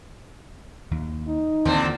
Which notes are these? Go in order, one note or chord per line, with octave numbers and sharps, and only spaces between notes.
D#2
D#4
D#2 A#2 D3 E3 C4